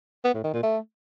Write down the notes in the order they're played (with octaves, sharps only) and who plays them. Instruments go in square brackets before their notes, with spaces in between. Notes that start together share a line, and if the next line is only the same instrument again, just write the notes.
[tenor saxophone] B3
A2
D#3
A#2
A3